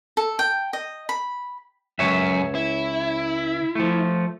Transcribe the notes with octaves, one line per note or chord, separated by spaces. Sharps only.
A4
G5
D#5
B5
C#2 F#2 C#5 E5
E4
F3 A3